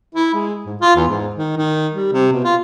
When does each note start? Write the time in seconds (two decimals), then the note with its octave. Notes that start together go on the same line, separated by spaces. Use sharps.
0.15 E4
0.34 G#3
0.65 G#2
0.80 F4
0.96 E2
1.08 G#2
1.35 D#3
1.57 D#3
1.93 G3
2.12 C3
2.32 B2
2.44 F4